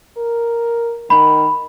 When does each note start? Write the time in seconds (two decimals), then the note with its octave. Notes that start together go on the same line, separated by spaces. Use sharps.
0.18 A#4
1.10 D#3 B5